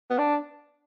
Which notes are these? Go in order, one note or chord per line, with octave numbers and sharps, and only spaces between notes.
B3
D4